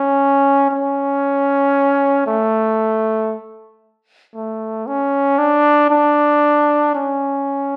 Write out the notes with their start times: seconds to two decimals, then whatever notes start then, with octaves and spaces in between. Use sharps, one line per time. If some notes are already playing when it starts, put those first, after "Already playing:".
Already playing: C#4
0.71 C#4
2.27 A3
4.35 A3
4.87 C#4
5.39 D4
5.91 D4
6.95 C#4